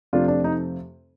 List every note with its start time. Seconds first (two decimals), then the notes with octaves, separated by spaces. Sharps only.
0.13 F2 C3 F3 A3 C4 D4 F4
0.28 D4
0.44 D#4